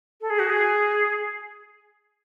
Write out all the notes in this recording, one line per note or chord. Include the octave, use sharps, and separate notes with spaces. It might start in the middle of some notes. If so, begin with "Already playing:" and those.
A4
G#4
F#4
G#4